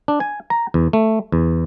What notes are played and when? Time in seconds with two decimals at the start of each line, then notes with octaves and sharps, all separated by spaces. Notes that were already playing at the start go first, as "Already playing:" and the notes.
0.08 D4
0.20 G#5
0.50 A#5
0.74 E2
0.93 A3
1.32 E2